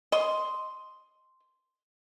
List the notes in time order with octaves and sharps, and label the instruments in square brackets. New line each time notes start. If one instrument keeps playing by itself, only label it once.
[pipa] D#5 C6